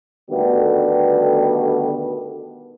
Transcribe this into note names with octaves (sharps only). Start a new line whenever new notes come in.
B2 D3 D#3 G3 A3 B3